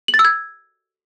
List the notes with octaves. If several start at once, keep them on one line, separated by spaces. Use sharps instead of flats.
F#7
A6
E6
G#6